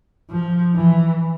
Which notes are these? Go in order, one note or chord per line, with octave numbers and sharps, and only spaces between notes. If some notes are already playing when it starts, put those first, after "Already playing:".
F3
E3